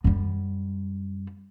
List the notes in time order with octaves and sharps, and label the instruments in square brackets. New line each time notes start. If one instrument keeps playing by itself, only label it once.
[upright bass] F#2 G3